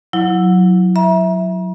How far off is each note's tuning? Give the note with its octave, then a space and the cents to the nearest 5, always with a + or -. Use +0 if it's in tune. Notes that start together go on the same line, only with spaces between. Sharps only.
F#3 -20 E4 +0
E5 -10 A#5 +40